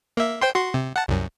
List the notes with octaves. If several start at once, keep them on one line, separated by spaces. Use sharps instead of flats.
A#3 E5
C5 G5 C6
F#4 C6
C3
F#5 A5
C2 F#2